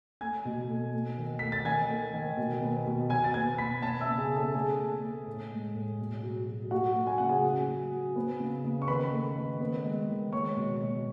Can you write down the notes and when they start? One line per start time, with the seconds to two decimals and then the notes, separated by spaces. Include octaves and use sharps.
0.21 A3 G#5 G#6
0.45 B2
0.70 A3
0.94 A3
1.17 D#3
1.39 A3 B6
1.52 A6
1.65 D#3 G#5 G#6
1.90 A3
2.14 D#3
2.37 B2
2.62 B3
2.86 B2
3.10 B2 G#5 G#6
3.24 A6
3.34 B3 G#5 G#6
3.58 B2 B5 B6
3.82 B3 A5 A6
4.01 E5 E6
4.07 C#3
4.18 G#4 G#5
4.31 B3
4.37 A4 A5
4.54 A3 G#4 G#5
4.79 A3
5.03 A3
5.27 A2
5.51 G#3
5.76 A2
5.99 B2
6.23 F#3
6.48 F#3
6.71 A3 F#4 F#5
6.95 A3
7.07 G#5
7.18 C#3 F#5
7.29 G#4 G#5
7.44 F#3
7.68 F#3
7.92 F#3
8.16 B3
8.40 C#3
8.64 C#3
8.82 C#6
8.88 D#3 B4 B5
9.12 A3
9.36 D#3
9.60 B3
9.84 G#3
10.09 D#3
10.32 G#3 C#5 C#6
10.57 B2
10.81 B2